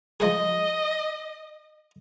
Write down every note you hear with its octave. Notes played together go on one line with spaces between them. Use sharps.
F3 G#3 G#4 D#5